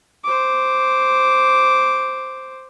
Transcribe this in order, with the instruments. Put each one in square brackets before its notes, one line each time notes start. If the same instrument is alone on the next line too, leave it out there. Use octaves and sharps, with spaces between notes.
[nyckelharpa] C5 D6